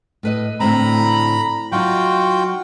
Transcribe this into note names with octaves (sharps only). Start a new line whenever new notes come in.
A2 B4 D#5
A2 D3 C4 A#5 B5
F#3 D#4 F4 F#4 G5